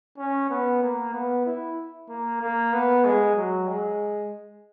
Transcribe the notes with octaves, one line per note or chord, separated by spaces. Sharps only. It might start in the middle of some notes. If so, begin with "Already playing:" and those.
C#4
B3
A#3
B3
E4
A#3
A#3
B3
G#3
F#3
G#3